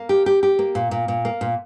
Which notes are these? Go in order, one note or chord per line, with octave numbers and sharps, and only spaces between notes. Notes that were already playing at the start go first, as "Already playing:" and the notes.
Already playing: A#3
G4
G4
G4
A#3
A#2
A#2
A#2
A#3
A#2